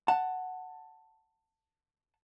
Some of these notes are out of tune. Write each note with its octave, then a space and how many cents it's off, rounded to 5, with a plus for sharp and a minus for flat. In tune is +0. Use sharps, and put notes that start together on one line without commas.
F#5 +0 A5 +15